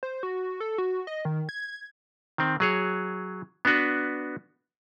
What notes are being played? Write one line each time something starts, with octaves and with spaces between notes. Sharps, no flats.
C5
F#4
A4
F#4
D#5
D#3
G#6
D#3 C4
F#3 G#4 C#5
B3 D4 F#4 B4